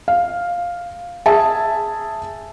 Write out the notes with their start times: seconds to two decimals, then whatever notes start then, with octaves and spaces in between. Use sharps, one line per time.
0.08 F5
1.26 G#4 E5 G#5 A5